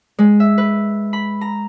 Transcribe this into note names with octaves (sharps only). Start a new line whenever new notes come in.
G#3
E5
B4
B5
A#5